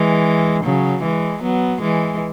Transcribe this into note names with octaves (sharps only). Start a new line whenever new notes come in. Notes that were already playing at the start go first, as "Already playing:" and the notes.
Already playing: E3 G#3
C#3 F#3
E3 G#3
F#3 B3
E3 G#3